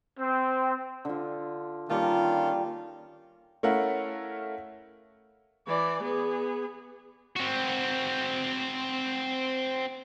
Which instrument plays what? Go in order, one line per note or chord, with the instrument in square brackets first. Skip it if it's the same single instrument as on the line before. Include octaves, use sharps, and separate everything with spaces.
[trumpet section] C4
[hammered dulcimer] D3 F4
[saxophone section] D#3 C#4 F4 [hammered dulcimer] G3 A#3 A5
[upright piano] A3 C#4 E4 A#4 F5 F#5
[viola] E3 D5
B3 G#4
[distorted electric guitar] C4 F#4